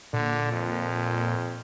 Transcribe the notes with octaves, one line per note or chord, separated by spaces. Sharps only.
A#2 D3
F2